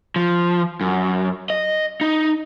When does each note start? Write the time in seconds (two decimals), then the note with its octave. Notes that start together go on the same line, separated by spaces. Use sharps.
0.16 F3
0.81 F#2
1.50 D#5
2.01 D#4